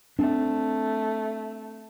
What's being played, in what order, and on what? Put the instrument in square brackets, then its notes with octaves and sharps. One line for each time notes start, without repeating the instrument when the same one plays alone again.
[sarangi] A3 [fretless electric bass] C4 D4